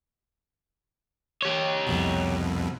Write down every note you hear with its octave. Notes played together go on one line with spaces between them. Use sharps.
G4 C#5
C2 F2 B2